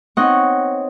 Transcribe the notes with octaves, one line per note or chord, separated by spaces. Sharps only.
B3 C4 D#4 C#5 D#5 F#5